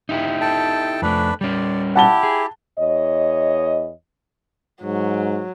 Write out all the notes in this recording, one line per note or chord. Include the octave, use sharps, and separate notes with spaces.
D#4 E4 G4
A4 G5 A5
F2 A3 D4 B4
G3 C#4 D5
E4 G4 F#5 A5 G7
G#4
E2 C#5 D#5
G#2 F#3